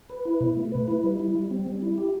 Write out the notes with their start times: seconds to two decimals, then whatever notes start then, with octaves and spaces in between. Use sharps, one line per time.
0.10 B4
0.25 E4
0.41 B2
0.57 A3
0.72 B4
0.88 E4
1.04 G3
1.20 E4
1.35 G3
1.51 C4
1.67 G3
1.82 E4
1.98 G4